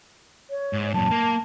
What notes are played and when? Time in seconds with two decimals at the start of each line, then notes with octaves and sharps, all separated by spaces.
0.50 C#5
0.73 G#2
0.94 F#2 A#2 A5
1.11 A#3